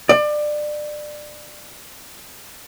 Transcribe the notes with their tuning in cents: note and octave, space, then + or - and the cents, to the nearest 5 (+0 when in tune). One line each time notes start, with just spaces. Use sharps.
D5 +25